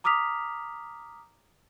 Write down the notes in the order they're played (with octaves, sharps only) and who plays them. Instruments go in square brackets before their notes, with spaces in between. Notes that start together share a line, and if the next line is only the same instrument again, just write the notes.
[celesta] A#5 D6 D#6 F6 B6 F7